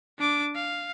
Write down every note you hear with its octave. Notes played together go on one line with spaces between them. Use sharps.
D4 D6
F5